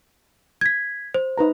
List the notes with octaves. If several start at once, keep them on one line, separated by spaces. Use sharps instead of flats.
G#6 B6
C5
D#4 B4 A#5